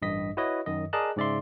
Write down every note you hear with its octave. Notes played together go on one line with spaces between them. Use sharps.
A1 G2 D#5 B6
E4 F#4 B4 C#5 D#5
F#2 D#3 D#5
G#4 A#4 D5 D#5 A5 F#6
G#2 C#3 D5 E5 C6